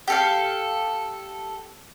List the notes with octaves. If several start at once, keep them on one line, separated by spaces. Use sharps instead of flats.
G4 A4 F5